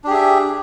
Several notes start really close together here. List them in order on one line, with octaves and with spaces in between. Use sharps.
D4 G4 G#4 E5